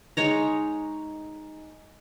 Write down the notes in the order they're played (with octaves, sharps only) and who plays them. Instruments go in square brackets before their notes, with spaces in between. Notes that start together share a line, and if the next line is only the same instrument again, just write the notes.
[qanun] G#3 D#4 C#5 A#5